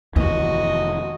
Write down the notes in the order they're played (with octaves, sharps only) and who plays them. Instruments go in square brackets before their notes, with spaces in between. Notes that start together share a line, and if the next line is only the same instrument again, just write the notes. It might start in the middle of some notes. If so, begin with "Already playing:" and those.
[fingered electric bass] F1 E3 [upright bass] D#3 A#3 [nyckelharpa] F#4 D#5